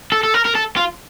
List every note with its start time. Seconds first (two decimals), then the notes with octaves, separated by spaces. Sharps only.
0.12 A4
0.23 A4
0.34 A#4
0.45 A#4
0.55 A4
0.77 F4